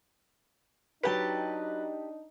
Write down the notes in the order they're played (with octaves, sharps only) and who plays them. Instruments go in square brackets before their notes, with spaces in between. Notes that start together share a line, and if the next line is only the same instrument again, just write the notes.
[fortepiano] F#3 B4 [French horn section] D4 D#4 [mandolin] G4 A5